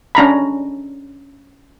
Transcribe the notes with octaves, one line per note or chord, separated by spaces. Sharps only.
C#4 D4 A#5 B5